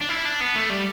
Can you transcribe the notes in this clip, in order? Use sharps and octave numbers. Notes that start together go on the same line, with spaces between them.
D4
E4
D4
B3
A3
G3